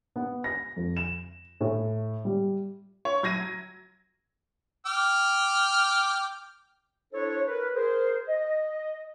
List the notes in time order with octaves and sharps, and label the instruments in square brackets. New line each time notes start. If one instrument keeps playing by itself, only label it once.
[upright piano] B3
A#6
F2
E7
A2
G3
[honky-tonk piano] C#5
F#3 G#6 A#6 D#7
[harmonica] G5 D6 F6
[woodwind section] D4 E4 A4 C5 C#5
A#4 B4
G#4 A#4 C5
D#5